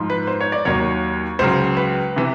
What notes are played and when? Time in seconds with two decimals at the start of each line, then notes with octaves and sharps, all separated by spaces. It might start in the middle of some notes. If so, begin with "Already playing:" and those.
Already playing: G#2 F3
0.10 B4
0.27 C5
0.41 C#5
0.52 D5
0.65 D#2 D#3 F#3 C#5
1.39 C#2 C#3 F#3 C5
1.77 B4
2.16 C3 E3